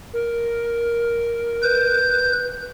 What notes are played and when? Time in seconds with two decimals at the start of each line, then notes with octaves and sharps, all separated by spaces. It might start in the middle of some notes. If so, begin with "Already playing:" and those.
0.13 A#4
1.63 B4 G6